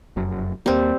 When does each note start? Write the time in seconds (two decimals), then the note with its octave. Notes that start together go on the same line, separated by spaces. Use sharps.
0.16 F1 F#2
0.66 D#2 G3 A#3 C4